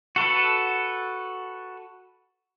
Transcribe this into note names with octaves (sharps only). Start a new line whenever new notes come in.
F#4 A4 B4